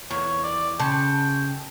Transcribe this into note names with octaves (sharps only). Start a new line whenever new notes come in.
E2 A#3 C#5
D5
C#3 G5 A5 C6 C#6